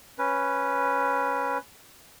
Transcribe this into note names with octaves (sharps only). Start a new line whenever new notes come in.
C#4 B4